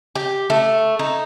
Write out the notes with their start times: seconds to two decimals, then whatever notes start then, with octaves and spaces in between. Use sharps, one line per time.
0.15 G4
0.50 A3
0.99 D#4